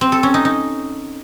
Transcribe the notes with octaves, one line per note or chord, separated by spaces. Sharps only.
C4
A4
C#4
D#4
D#4